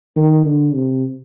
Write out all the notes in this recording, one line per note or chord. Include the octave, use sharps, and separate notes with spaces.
D#3
D3
C3